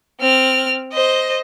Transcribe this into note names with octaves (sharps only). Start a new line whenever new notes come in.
C4 F6
C5 D#5